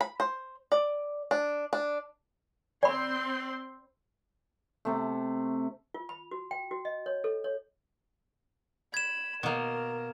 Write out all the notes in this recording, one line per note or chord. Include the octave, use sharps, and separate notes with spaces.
B5
C5
D5
D4
D4
C4 D5 B5 C6
C3 A3
F4
B5
F#4
G5
F#4
D#5
C#5
A4
C#5
B5 G#6 E7
B2 A#3 A#4